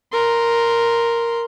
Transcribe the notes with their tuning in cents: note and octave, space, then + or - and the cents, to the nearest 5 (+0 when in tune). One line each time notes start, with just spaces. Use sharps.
A#4 +0 C6 +0